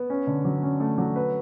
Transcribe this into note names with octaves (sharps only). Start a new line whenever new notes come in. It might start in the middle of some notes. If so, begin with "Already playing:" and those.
Already playing: B3
C#4
D3
F#3
C#4
A3
F#3
B4